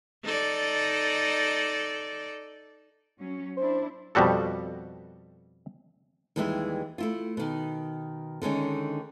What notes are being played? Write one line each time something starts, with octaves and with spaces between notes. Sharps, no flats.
D#4 A4 D5
F#3 C#4
D4 E4 C5
F2 B2 G3 F#4 A4
D#2 E3 G3 G#3 D#5 E5
A3 E4 F4
B2 D#3
D3 D#3 G#3 C#4